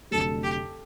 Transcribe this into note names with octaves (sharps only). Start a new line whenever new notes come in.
F1 F2 D3 F#3 A3 A4
G4